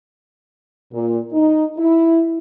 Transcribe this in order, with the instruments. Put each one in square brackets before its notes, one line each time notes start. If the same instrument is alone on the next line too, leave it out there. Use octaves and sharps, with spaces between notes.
[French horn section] A#2
D#4
E4